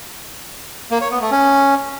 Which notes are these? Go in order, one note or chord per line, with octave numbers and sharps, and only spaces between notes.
A#3
C#5
B3
A3
C#4